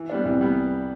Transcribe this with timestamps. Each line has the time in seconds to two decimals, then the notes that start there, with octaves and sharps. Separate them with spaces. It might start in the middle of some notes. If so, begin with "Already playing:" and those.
Already playing: E3
0.09 G3 B3 D4
0.25 C2 C3 E3
0.41 G3 B3